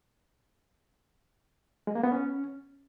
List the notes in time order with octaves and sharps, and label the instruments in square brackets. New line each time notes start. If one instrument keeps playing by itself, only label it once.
[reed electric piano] G#3
A#3
B3
C#4